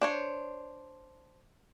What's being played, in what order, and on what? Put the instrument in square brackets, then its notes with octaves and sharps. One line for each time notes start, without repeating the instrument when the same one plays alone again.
[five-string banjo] D4 C5 C#5